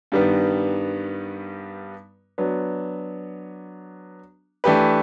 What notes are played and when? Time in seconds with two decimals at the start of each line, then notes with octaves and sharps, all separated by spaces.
0.12 G2 D#3 G3 B3
2.38 F#3 B3 D4
4.64 E3 A3 D4 G4 B4